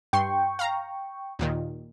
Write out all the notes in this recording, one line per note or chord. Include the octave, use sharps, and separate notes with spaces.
G2 G5 C6 C#6
F5 A#5
D#2 A#2 D#3